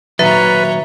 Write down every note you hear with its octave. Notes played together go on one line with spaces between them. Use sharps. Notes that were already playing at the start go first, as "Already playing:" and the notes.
A#2 D#3 F#3 B4 C#5 E5 A#5